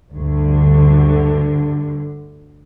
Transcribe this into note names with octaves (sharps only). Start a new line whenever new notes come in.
D2 G2 D3